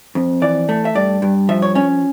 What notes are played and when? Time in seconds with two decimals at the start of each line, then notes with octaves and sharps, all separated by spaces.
0.15 F2
0.42 E3 D5
0.69 A3
0.85 E5
0.95 G2 D5
1.22 G2
1.49 F3 E5
1.62 C#5
1.75 C#4 C#5